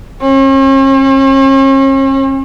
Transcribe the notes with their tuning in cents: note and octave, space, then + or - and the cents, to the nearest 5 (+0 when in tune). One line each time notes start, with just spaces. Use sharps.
C#4 -45